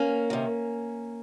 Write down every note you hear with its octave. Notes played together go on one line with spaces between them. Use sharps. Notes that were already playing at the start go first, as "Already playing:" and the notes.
Already playing: A#3 C#4
C3 D#3